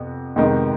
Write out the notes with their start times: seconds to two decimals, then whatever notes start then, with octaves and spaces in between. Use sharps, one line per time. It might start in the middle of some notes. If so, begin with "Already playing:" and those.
Already playing: F2 C3 B3
0.36 F2 C3 D#3 G#3 B3